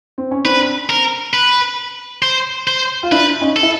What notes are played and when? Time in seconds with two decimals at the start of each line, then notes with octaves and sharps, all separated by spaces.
0.18 C4
0.31 C#4
0.45 C4 D4 B4
0.90 A#4
1.33 B4
2.22 C5
2.67 C5
3.03 F4
3.11 D4 E4 B4
3.41 C#4 D#4
3.56 A4
3.62 E4